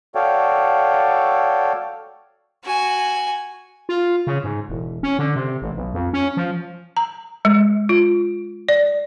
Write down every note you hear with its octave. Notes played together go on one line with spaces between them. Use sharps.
F#4 A4 C#5 D5 F5 G5
F#4 G#5
F4
C#3
G#2
E1
C#4
D3
C3
A1
B1
F2
C#4
F3
A#5
G#3
F4
D5